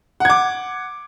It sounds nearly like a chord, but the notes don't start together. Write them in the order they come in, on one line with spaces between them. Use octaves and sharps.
F#5 G#6 D6